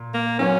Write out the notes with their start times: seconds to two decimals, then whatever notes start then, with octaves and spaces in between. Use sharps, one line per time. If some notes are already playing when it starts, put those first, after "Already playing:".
Already playing: A#2
0.14 A#3
0.39 F#3 C4 C#4 F#4 C#5